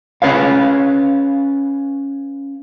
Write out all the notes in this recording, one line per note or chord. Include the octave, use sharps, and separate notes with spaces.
C#4 B4 C#5 F5